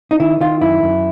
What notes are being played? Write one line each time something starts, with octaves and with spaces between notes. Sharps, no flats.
D#4
D#3 E4
D#3 F4
F#2 E4
F#2